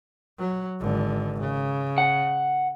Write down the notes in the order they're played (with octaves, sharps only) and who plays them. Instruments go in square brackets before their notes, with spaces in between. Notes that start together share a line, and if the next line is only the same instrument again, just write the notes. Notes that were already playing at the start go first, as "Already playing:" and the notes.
[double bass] F#3
G#1 D3
C#3
[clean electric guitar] F#5